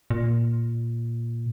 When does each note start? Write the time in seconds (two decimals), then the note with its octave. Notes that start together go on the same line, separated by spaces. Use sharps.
0.10 A#2